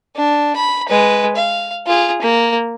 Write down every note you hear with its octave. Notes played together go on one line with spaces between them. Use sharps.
D4
B5
G#3 B4
F5
F4 G#4
A#3